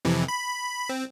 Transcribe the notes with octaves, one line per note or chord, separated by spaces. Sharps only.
F2 C3 E3
B5
C4